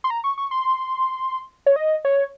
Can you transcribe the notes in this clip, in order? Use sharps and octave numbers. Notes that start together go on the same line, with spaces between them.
C6
A#5
C#6
C#6
C6
C#5
D#5
C#5